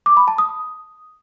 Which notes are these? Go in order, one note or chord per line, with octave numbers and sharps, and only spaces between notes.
D6
B5
A5
D#6